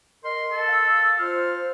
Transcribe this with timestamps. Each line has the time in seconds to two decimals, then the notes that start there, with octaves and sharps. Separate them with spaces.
0.24 A#4 D#5 C6
0.52 A4
0.68 F5 E6
1.19 F4 C5 F5